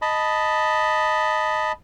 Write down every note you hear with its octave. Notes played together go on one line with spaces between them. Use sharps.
D#5 A5 B5